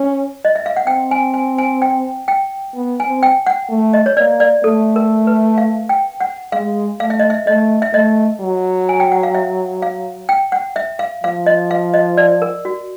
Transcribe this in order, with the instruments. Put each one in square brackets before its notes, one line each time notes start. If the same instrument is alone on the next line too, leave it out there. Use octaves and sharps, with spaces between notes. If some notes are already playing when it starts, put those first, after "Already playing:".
Already playing: [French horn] C#4
[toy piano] D#5
E5
F5
F#5
[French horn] C4 [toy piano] G5
[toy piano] G#5
G#5
G#5
G5
G5
[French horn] B3
[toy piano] G#5
[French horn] C4
[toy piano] G5
F#5
[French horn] A3
[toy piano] D#5
C#5
[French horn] A#3 [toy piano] D5
[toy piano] D5
[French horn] A3 [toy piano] A4
[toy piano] A#4
B4
F5
G5
F#5
[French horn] G#3 [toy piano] F5
[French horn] A3 [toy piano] F5
[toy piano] E5
D#5
E5
[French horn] A3 [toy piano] D#5
[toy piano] E5
[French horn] A3 [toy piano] D#5
[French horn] F#3
[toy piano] G#5
G5
F#5
F5
E5
F5
G5
F#5
E5
F5
[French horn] F3 [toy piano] F5
[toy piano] D#5
F5
D#5
D5
A#4
F#4